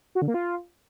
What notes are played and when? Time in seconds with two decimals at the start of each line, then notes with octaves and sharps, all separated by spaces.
0.15 F#4
0.22 D3
0.28 A#3
0.34 F4